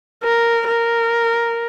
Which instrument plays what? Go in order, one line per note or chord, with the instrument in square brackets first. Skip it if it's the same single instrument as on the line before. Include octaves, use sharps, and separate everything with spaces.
[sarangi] A#4
A#4